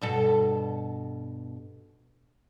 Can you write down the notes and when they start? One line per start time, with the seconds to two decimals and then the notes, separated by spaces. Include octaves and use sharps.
0.01 G2 B2 A4